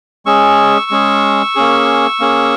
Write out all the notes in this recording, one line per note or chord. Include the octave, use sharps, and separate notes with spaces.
G#3 C#4 G#4 C#6 E6
G#3 C#4 G#4
A#3 C#4 G#4
A#3 C#4 G#4